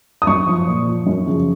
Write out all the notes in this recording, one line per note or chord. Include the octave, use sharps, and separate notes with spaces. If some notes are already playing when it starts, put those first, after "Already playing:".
D#6
F#2 C#6
F3
A#2
F3
F#2
C#3 F3